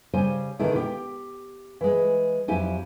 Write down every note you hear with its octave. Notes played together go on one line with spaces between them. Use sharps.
C#3 G3 C5 G#5
B2 D3 D#3 G#3 E4
G4 G5
E3 G#3
F2 F#3 E4 G4 G#5